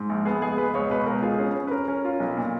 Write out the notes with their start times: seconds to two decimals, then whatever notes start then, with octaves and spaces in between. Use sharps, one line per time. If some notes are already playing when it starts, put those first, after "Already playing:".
Already playing: G#2
0.10 A#1
0.25 B3 G#4
0.42 C#2 G#4
0.58 G#3 B4
0.74 C#2 C#5
0.90 B2 B4
1.06 C#2 A#4
1.22 F4 G#4
1.39 C#4
1.55 C#4
1.67 B4
1.71 C#4 A#4
1.88 C#4
2.05 F4
2.20 B1
2.37 A#2